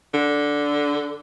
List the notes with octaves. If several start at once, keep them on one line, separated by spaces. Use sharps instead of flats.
D3